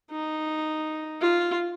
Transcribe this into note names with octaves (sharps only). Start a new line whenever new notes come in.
D#4
F4